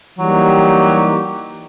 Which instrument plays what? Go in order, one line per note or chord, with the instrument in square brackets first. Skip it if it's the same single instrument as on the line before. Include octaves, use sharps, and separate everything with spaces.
[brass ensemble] E3 G3 A#3 D#4 G4 [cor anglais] F#3